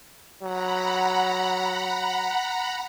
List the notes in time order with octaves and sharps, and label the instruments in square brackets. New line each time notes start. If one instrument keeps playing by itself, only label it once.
[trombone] F#3 [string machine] F#5 A#5 B5